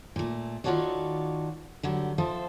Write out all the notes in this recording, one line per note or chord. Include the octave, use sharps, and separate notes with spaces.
A#2 A3
D#3 F4 F#4 A4 C#5 D5
D3 F#3 G3
F3 A4 C5 E5